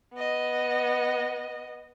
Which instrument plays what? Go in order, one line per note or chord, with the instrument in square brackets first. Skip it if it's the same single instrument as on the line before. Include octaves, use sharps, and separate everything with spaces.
[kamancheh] B3 D#5